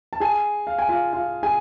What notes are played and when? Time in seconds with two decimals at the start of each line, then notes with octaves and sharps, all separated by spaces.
0.13 A5
0.20 G#4 G#5
0.67 F5
0.79 G#5
0.88 F4 F5
1.13 F4 F5
1.43 G#4 G#5